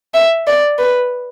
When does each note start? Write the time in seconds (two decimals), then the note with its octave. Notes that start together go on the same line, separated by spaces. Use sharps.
0.14 E5
0.47 D5
0.79 B4